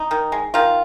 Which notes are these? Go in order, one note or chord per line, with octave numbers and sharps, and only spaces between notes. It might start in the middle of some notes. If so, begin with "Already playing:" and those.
Already playing: D#4
D#3
G#3
D#3 F4